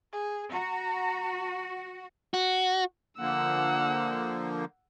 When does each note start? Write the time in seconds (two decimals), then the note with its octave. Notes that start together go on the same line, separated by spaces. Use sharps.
0.12 G#4
0.52 F#4 A#5
2.34 F#4
3.19 D3 F3 A#3 F#5 E6